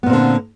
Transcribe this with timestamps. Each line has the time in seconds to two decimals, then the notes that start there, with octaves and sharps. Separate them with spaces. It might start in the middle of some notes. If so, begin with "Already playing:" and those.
0.03 B3
0.06 A#2
0.10 C4
0.13 D3